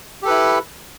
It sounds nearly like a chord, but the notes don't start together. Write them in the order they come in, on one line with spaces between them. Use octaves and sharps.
G4 A4 B4 E4